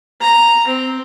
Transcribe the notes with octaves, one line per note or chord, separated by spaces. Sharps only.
A#5
C4